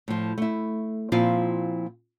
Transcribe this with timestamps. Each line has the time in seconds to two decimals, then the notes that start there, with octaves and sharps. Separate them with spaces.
0.08 A2 F3
0.38 A3 E4
1.12 A#2 F3 C4 E4 F4 F5